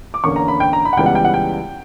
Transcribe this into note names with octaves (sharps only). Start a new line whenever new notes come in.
D6
E2 D3 A#3 C#4 C#6
A#5
B5
G5
A#5
B5
F#5
C#2 C#3 E3 G3 B3 G5
F#5
G5
F#5
G5